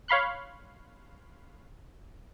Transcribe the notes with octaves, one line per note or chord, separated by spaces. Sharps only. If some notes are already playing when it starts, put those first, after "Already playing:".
C#5 F5 B5 C6 F#6